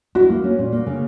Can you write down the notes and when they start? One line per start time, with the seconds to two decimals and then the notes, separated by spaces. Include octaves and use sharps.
0.15 E4 F#4
0.30 A#3
0.44 C#4
0.59 A#2
0.72 A#3
0.87 C#3